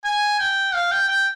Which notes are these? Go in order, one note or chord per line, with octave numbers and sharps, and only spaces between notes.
G#5
G5
F5
G5
G5